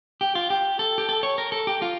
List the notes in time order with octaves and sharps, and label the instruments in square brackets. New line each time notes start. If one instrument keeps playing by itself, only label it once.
[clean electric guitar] G4
F4
G4
A4
G4
A4
C#5
A#4
A4
G4
F4